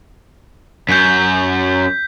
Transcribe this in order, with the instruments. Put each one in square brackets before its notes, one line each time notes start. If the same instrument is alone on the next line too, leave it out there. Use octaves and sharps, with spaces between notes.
[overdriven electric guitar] F#2 [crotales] G6 B6